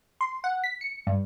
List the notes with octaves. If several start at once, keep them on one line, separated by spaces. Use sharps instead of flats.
C6
F#5
B6
C#7
G2